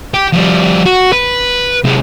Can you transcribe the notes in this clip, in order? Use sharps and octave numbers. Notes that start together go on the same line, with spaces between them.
G4
F3 G3
F#4
B4
C3 G#3